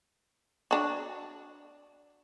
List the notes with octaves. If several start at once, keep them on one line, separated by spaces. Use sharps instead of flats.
D4 F#4